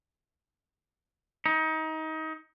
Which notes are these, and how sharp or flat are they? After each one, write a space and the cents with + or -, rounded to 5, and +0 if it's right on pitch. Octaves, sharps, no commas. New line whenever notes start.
D#4 +25